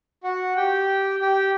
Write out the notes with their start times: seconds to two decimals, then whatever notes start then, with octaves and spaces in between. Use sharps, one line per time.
0.24 F#4 F#5
0.57 G4 G5
1.21 G4 G5